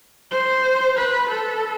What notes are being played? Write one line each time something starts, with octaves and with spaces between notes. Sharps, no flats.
C5
B4
A4